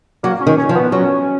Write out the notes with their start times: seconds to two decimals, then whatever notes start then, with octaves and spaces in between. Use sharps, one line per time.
0.23 F#3 A#3
0.41 C#4
0.47 D#3
0.58 C#4
0.69 F3
0.75 B3
0.92 F#3 C#4